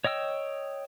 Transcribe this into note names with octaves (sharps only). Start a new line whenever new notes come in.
C#5 D#5 G5 E6